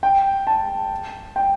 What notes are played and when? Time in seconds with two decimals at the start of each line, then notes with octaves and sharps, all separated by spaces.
0.03 G5
0.47 A5
1.36 G5